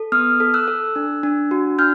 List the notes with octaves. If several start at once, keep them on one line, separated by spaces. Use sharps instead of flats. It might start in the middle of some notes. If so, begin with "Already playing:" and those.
Already playing: A4
B3 D#6 F6
A4
E6 F#6
A4
D4
D4
F#4
D4 F6 G6